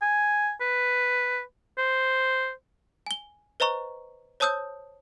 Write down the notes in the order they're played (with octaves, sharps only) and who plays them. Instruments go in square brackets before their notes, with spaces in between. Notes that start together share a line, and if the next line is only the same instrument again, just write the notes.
[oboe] G#5
B4
C5
[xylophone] G#5 G7
B4 C5 D#5 A#5 C#6
C5 C#5 A5 D#6 E6 G6